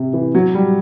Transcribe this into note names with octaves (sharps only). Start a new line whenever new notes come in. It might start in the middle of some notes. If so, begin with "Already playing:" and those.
Already playing: C3
E3
F#3
G3